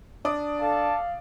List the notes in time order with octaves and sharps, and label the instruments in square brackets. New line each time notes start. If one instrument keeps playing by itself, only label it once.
[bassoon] D4 [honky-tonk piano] D5 D#6
[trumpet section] A4 A5 [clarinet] F5